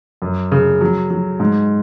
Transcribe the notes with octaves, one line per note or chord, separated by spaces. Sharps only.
F#2
C#3
F#3
F#3
G#2